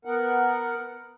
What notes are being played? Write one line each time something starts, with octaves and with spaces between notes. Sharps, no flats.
B3 A#4 F#5